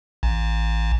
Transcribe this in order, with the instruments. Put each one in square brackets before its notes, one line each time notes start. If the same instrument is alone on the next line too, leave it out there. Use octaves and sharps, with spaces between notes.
[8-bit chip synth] A1